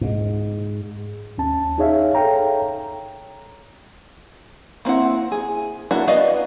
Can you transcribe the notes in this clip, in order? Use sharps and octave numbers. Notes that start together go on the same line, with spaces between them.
G#2
D#2 C#4 A5
D#4 G#4 C#5 E5 F5
A4 C#5 F5 G5 A#5
A#3 C4 E4 F#5
G#4
A#3 D4 E4 F#4
B3 F#4 D5 D#5 F5